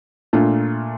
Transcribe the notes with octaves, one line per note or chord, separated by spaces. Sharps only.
A#2 A3 D4 F4